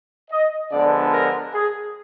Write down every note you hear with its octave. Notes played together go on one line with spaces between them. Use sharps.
D#5
D3 F3 G#3 B3 D5
A#4
G#4